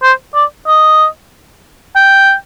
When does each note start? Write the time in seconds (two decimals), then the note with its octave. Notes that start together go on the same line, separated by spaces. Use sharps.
0.03 C5
0.35 D5
0.67 D#5
1.95 G5